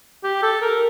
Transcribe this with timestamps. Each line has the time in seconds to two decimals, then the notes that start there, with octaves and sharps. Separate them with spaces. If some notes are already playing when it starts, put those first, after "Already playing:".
0.24 G4
0.43 A4
0.62 A#4